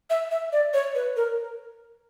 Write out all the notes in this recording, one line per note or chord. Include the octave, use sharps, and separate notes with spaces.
E5
E5
D5
C#5
B4
A#4